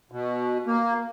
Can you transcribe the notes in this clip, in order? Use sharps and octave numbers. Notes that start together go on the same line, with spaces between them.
B2
A#3